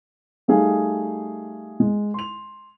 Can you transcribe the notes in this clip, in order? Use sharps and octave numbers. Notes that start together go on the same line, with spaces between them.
G3 A3 D#4 G#4 F5
G#3
C6 F7